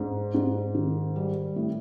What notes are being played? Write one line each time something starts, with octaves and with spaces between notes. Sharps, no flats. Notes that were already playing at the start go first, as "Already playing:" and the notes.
Already playing: G#2
G#2
D#3
G3
A2